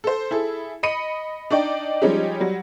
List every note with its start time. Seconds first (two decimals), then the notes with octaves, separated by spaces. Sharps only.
0.04 A4 C5
0.31 E4 G#4 A4
0.83 D#5 B5 C#7 D#7
1.51 D4 D#4 D5 G5
2.02 F3 G3 G#3 C#4 D#4 G4
2.40 F#3 G3